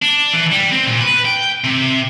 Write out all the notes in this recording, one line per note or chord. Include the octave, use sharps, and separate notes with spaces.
D4
E3
G3
C4
A#2
B4
G5
C3